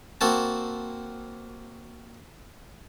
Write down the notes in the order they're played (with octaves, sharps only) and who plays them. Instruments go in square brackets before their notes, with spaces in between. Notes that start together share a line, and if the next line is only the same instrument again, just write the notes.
[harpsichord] A#3 C4 F#4 A5